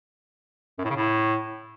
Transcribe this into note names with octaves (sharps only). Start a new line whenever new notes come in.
F#2
A2
C#3
A2